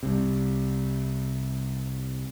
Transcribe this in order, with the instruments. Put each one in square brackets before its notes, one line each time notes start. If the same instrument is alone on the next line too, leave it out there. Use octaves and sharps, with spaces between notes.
[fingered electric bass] C2 C3